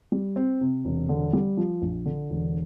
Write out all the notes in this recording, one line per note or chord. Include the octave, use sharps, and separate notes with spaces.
G3
C4
C3
E1
D3
G3
F3
A#1
D3
E1